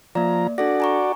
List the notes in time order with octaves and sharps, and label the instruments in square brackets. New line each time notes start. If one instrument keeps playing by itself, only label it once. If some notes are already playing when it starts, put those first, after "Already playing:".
[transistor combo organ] F3 A#5 [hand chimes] A#3 D5
[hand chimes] D4 A4 A#6 [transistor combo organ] F#4 D5
[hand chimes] G#5 A#5 C#6